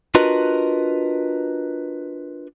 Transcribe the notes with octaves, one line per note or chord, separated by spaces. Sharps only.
D4 F4 F#4 A#4 B4 D#5